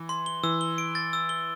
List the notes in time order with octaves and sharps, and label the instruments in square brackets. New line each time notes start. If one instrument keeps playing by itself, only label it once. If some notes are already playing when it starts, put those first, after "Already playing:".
Already playing: [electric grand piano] E3
[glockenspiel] C6
G7
[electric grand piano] E3 [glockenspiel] E6
[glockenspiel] G7
D7
A6
E6
G7